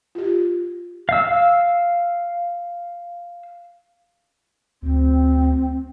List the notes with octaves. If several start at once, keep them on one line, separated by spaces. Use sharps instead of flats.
F4 G4
F5 E6
D2 C4